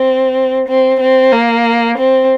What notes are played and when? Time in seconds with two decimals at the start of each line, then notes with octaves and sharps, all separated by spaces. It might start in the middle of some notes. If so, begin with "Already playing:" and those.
Already playing: C4
0.68 C4
1.00 C4
1.32 A#3
1.98 C4